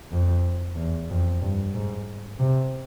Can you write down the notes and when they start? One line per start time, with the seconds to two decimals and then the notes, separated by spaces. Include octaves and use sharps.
0.11 F2
0.76 E2
1.10 F2
1.41 G2
1.74 G#2
2.39 C3